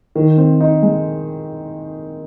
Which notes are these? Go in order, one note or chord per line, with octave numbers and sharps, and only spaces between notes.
D#3
C4
D#4
G#3